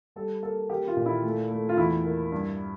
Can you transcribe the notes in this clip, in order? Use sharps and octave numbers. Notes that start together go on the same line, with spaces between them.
G3 A4
A#3 A4
A#3 G4
F4
A#2
E4
A3
A3
F4
E2 E4
A#3
G2